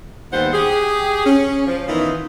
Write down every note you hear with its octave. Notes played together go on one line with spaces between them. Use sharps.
D#2 G3 B3 F4 C5 F#5
G4 G#4
C#4
F3
D#3 E3 B3 C#4 D#4 F4